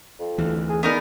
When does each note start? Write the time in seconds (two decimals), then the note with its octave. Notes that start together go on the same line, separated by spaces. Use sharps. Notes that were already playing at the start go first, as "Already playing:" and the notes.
0.20 F2
0.38 D2 E3
0.70 G#4
0.83 D3 B3 D#4 A#4